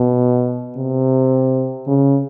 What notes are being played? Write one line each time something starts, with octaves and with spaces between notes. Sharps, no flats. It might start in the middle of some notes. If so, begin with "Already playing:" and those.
Already playing: B2
C3
C#3